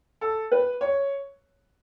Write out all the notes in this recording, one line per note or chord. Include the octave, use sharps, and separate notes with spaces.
A4
B4
C#5